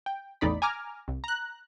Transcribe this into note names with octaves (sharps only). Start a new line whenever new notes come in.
G5
A1 E2 A2 D#4 D5 B5
G#5 A#5 D6 F6
C2
A#5 F#6